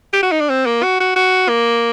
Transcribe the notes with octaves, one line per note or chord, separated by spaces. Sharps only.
G4
F#4
D#4
D4
C4
A#3
F#4
F#4
F#4
A#3